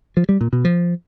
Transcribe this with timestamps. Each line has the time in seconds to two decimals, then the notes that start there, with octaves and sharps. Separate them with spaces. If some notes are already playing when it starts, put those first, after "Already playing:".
0.17 F3
0.29 G3
0.41 A#2
0.53 B2
0.65 F3